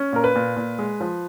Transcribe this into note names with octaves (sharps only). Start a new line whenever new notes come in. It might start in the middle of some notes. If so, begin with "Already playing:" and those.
Already playing: C#4
A#2 A#4
B4
A#2
A#2
G#3
F3